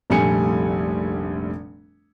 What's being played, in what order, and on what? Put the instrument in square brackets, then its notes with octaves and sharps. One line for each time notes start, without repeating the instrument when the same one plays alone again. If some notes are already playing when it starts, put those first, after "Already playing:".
[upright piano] F1 A#1 G3 A3 G#5 C#7